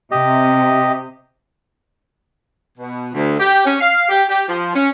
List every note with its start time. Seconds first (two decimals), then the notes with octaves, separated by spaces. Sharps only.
0.11 C3 G4 D#5
2.78 B2
3.13 D2
3.39 G4
3.65 C#4
3.79 F5
4.09 G4
4.28 G4
4.47 F3
4.74 C#4